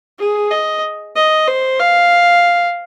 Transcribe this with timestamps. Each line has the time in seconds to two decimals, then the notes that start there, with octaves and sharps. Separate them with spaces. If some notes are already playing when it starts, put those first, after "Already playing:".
0.19 G#4
0.51 D#5
1.16 D#5
1.48 C5
1.79 F5